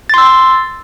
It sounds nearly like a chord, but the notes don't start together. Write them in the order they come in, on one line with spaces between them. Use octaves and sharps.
A6 C6 E6